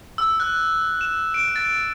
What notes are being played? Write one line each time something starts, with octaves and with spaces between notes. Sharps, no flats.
E6
F#6
E7
D7
A6